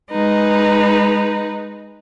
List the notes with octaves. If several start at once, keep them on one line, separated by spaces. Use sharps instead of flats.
G#3 D#4 B4